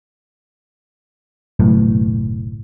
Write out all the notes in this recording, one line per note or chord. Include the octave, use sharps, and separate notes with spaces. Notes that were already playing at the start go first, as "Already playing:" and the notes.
F#1 B1 A2